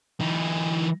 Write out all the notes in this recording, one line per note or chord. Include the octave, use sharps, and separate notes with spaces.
E3 D#4